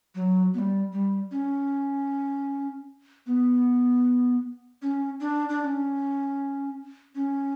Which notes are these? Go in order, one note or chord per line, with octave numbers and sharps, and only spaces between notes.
F#3
B3
G3
G3
C#4
B3
C#4
D4
D4
D4
C#4
C#4